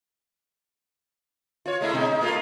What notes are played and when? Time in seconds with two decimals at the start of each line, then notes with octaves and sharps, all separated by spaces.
1.66 F4 C#5
1.81 G#3 A3 E4
1.93 B2 G#3 D#4
2.07 D#4
2.21 A3 A#3 F4